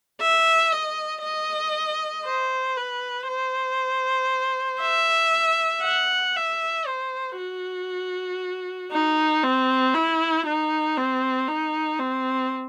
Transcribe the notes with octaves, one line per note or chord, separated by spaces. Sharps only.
E5
D#5
D#5
C5
B4
C5
E5
F#5
E5
C5
F#4
D#4
C4
E4
D#4
C4
D#4
C4